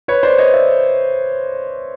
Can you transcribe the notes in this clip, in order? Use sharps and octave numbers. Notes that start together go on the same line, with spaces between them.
B4 C#5
C5 D5
C#5 D#5
D5 E5